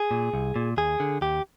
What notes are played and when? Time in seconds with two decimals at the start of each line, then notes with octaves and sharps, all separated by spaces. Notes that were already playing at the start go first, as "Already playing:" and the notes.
Already playing: G#4
0.11 A#2
0.34 C2
0.56 A#2
0.77 D#2 G#4
1.00 D3
1.21 D#2 G4